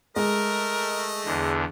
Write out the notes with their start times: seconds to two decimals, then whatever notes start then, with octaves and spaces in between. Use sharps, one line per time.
0.16 G#3 A3 A#4 D#5
1.25 E2 D3